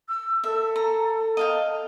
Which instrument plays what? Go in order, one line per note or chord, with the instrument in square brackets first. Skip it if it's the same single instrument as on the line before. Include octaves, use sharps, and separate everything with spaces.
[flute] E6
[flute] A4 [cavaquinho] E5
[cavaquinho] A#5
D#5 F5 G5